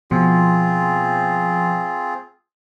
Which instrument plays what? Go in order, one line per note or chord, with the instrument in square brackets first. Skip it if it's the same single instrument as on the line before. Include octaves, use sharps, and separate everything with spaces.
[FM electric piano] B2 F3 [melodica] C4 F4 G#4